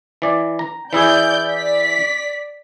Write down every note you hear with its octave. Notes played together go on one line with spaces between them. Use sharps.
E3 D5
A#5
E3 E4 G#4 D5 G6
D5 B6